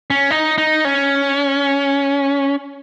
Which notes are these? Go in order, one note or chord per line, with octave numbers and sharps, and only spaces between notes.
C#4
D#4
D#4
C#4